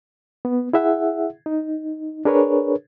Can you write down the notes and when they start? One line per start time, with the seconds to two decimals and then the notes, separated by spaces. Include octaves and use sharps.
0.45 B3
0.73 E4 G#4 E5 F#5
1.46 D#4
2.25 D4 G#4 A#4 B4 C#5